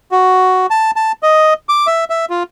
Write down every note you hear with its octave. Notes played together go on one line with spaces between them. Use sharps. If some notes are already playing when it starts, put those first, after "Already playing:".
F#4
A5
A5
D#5
D6
E5
E5
F4